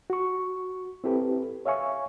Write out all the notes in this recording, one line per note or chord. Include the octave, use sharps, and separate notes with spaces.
F#4 C#6
C4 E4 G4 A4 B4
C#5 E5 F5 G#5 C#6